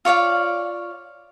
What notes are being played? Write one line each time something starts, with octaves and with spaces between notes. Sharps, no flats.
F4 C#5 D5 F5